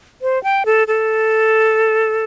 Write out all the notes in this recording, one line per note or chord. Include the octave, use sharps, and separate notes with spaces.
C5
G5
A4
A4